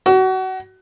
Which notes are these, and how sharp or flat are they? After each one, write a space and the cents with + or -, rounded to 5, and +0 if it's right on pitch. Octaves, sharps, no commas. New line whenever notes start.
F#4 +25